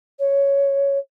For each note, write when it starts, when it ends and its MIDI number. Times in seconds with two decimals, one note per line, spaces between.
0.19 0.97 73